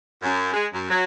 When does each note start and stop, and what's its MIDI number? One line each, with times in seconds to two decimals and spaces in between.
0.22 0.49 42
0.54 0.66 56
0.73 0.85 42
0.90 1.04 54